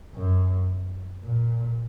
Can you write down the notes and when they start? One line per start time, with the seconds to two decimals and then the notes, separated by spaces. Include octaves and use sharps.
0.15 F#2
1.24 A#2